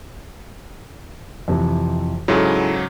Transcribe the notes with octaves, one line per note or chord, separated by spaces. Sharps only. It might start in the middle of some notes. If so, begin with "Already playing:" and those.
F2 C3 E3
G#2 C#3 F#3 E4 G#4 A4